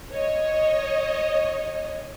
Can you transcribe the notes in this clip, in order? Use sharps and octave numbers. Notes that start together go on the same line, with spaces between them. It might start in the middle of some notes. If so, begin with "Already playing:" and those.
C#5 D#5